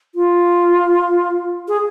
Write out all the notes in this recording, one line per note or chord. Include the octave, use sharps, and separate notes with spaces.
F4
G#4